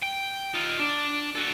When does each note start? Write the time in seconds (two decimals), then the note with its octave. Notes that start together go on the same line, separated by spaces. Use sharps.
0.02 G5
0.54 D#4 F4
0.79 D4
1.36 F#4 A4